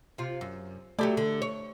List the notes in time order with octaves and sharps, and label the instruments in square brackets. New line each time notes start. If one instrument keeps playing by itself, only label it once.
[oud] C3 F4
F#2
[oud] F#3 G4 D5 [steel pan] A3
[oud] D3
C#5